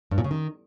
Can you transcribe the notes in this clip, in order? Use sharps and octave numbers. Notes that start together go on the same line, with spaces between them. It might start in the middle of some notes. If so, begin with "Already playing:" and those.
G2
A#2
C#3
D#3